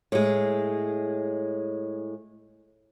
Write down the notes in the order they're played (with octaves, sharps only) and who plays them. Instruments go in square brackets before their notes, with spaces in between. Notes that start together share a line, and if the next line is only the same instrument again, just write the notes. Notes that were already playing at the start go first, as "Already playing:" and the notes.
[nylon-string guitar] A2 G#3